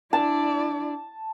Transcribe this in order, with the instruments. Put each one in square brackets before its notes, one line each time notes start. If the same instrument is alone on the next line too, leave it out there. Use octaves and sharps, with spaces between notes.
[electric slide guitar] D4 [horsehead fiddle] E4 D5 [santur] A5